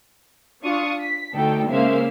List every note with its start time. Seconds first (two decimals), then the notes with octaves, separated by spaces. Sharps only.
0.62 D4 F4 F5 C#6 D#6
1.01 B6
1.34 D2 D#4 A4 G5
1.69 C#3 G#3 A#3 C5 E5 F5